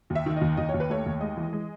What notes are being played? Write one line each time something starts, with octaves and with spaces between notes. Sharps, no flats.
D#2
E5
D#3
D#2 D#5
D#2 D#5
D#2 C#5
B4
A3 C#5
D#2
G#3 D#5
E3
G#3